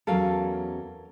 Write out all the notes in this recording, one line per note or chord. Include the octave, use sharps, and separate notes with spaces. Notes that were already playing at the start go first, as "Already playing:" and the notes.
E2 F#3 C#4 A4 A#4 F5